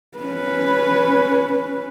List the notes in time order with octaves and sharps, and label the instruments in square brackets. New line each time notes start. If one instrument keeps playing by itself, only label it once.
[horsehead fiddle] C#4 B4